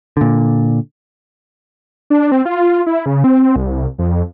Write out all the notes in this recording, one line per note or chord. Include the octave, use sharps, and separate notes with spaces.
A#2 D3
D4
C4
F4
E4
C#3
C4
C2
F2